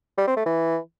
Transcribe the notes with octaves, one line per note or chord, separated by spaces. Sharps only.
G3
C4
A3
E3